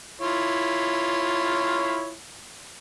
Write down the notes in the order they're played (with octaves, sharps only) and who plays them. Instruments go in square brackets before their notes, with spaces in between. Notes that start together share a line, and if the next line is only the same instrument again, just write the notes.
[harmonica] E4 F4 C#5